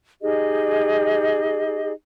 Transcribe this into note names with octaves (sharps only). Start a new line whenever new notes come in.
D#4 G4 G#4 D#5